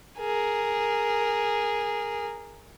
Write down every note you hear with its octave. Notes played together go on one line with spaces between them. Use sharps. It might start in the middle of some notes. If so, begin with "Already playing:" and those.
G#4 A#4